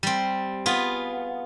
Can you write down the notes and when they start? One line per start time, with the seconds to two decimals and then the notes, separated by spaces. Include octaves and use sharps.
0.03 G3 C4
0.66 B3 F4 G#4